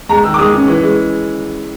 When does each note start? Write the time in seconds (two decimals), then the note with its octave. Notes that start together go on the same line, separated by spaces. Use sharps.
0.09 G#3 A#5
0.24 D#3 E6
0.34 D6
0.39 G#3 D#6
0.53 C#4
0.68 E3
0.82 G#3